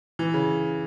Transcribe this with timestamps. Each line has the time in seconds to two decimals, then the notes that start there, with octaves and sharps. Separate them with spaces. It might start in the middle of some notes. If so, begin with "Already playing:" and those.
0.19 E3
0.34 C#3